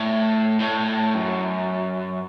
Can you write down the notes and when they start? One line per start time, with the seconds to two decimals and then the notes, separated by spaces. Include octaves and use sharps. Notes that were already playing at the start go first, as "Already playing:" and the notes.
Already playing: A2
0.60 A2
1.14 F#2